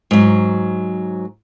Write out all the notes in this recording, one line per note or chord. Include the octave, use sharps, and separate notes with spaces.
G#2 F#3